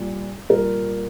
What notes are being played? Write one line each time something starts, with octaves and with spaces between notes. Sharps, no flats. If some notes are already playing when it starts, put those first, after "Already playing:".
Already playing: A#2 G3
A#2 G3 A#4